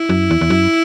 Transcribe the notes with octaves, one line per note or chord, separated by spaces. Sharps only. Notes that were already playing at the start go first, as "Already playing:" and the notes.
Already playing: E4
F#2
E2
E2
F#2